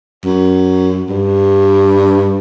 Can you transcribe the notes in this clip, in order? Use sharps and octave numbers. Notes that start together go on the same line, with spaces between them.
F#2
G2